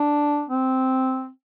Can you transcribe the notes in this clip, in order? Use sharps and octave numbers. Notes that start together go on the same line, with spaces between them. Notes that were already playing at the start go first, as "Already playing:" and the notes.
Already playing: D4
C4